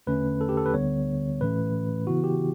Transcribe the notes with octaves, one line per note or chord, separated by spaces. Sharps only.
E2 D3 A3 C#4 B4
A4
G4
A4
B4
D2 D3 G3 B3 C#5
A2 E3 A3 C#4 B4
C#3 E3 B3 E4 F#4
G4